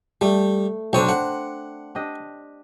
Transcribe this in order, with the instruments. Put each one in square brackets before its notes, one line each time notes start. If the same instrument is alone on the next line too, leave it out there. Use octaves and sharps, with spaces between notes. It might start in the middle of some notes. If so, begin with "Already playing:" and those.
[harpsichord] G3 [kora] A3
[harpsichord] B1 C#5 D#6 [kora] C4 D4
[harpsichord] F#5
[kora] D4 G4 D#5